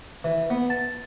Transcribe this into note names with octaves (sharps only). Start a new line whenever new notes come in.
E3
B3
A5